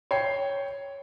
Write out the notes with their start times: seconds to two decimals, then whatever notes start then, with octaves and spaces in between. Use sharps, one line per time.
0.11 C#5 G5 C7